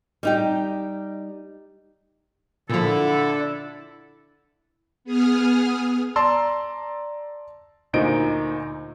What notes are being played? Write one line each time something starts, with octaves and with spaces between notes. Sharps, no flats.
G3 D#4 G4
A#2 D3 F3 E4 A4
B3 G#4 D#6 F6
D5 A5 A#5 C6 E6
D2 A#2 D#4 C5 D#5 D7